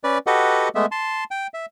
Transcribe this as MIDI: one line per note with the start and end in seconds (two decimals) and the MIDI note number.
0.04 0.18 61
0.04 0.18 71
0.04 0.18 74
0.27 0.69 66
0.27 0.69 67
0.27 0.69 69
0.27 0.69 71
0.27 0.69 75
0.27 0.69 78
0.75 0.86 56
0.75 0.86 57
0.75 0.86 59
0.75 0.86 76
0.92 1.24 81
0.92 1.24 84
1.31 1.47 79
1.54 1.66 76